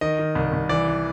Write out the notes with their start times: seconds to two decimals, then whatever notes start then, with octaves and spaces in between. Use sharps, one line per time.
0.01 D#3 D#5
0.19 D#3
0.35 C2
0.53 C2
0.69 E3 D5
0.88 E3